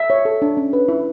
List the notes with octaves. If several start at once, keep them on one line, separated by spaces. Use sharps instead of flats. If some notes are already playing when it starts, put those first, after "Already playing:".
Already playing: E5
C#5
A4
D4
C#4
B4
E4